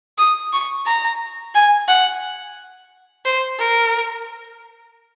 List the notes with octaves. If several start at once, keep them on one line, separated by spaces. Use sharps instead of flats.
D#6
C#6
A#5
G#5
F#5
C5
A#4